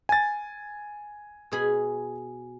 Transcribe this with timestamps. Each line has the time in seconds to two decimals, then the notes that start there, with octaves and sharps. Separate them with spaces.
0.09 G#5 A6
1.52 B2 G#4 B5